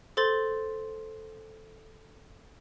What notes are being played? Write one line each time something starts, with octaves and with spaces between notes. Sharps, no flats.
A4 C5 C6 A6 G7